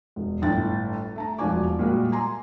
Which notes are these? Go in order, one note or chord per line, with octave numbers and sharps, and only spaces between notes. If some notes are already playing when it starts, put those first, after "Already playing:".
E1
G1 A2 G5 A6
A3 A5 A#5
E1 F3 F#4 D5 G#5 D6
A#2 G3 G#3 F#4
G#5 A#5 C6